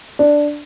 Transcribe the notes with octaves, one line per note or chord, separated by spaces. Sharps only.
D4